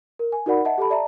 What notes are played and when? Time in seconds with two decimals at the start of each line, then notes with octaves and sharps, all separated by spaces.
0.19 A#4
0.32 G#5
0.46 D#4 F#4 A#4 D5 F#5 B5
0.65 D#5 E5 F#5 A5
0.78 G4 A4 A5 B5
0.90 D5 E5 A5 A#5